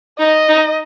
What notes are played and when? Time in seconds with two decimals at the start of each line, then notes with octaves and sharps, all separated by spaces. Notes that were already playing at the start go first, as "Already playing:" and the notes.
0.19 D#4 D#5
0.49 D#4